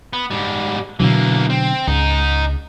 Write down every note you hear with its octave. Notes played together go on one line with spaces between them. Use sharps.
B3
G#2 G3
B2 D3 E3 F#3 A#3
C4
C#2 D#4 G#4